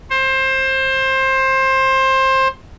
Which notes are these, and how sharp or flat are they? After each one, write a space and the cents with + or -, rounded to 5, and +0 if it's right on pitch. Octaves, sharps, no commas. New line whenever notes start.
C5 +20